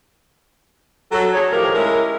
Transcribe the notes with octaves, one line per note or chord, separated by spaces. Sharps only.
F#3 A4
D4 G#4 C#5
A2 D#3 F3 G4 A#4
G#3 C#4 E4 A#4